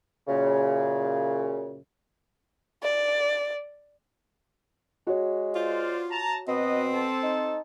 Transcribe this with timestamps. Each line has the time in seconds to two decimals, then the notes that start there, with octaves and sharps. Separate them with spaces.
0.28 F#2 A#2 C#3
2.83 D5
5.07 G#3 F#4 C#5
5.55 F4 C5 D5 F5
6.11 A5 A#5
6.48 B2 C4 B4 D#5
6.94 A4 C5 A5
7.23 D#4